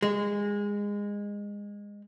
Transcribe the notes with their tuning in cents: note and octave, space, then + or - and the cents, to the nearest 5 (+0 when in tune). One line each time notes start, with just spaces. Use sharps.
G#3 -20